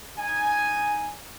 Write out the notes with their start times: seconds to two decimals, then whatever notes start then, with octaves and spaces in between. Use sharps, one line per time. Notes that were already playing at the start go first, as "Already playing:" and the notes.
0.19 D#4 G#5